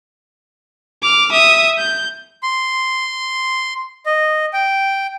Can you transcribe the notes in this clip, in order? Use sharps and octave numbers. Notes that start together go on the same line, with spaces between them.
D6 F6
E5 D#6
G6
C6
D#5
G5